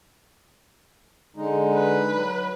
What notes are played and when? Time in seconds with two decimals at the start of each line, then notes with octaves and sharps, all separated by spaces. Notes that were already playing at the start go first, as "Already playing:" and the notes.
1.36 D3 G#3 D#4
1.74 B4
2.13 F#3